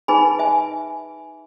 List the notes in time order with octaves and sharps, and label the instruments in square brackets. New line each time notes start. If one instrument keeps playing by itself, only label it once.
[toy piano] D#4 G#4 B4 G#5 B5
E5 G#5